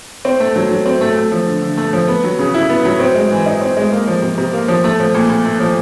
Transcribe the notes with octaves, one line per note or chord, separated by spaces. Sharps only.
C4
A3
F#3
F#3
C4
A3
A3
F3
D3
D3
A3
F3
B3
F#3
C#3
E4
B3
F#3
C4
G#3
E3
D#4
C4
G#3
A#3
F3
C3
C3
A#3
F3
A3
F3
A#2
A#2
A3
F3